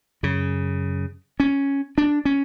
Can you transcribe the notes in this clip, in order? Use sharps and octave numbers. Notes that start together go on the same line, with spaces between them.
F#2 C#3
C#4
D4
C#4